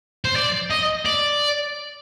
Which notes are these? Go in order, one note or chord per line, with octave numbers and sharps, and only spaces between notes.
C5
D5
D#5
D5